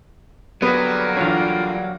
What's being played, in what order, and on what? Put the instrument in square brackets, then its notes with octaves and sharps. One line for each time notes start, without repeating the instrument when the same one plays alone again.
[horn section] D3 G3 A#3 [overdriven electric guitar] F#3 [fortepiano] B3 [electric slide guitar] G#4 B4
[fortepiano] E2 G2 C#5 [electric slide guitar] D4 F4